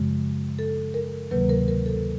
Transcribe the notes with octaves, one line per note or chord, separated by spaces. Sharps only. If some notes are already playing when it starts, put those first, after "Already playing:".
Already playing: F#2 C#3 F3 G#3
A4
A#4
D2 C3 D#3 F#3 A#3 B4
A#4
A#4
A4